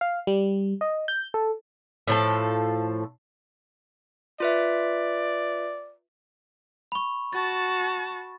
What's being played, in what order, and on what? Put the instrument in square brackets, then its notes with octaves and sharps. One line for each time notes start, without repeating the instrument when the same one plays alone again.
[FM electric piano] F5
G3
D#5
G6
A4
[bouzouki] A2 F3 A4
[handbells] F4 B4 E5 [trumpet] D5
[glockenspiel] B5 C#6
[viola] F#4 A5 [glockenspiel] A6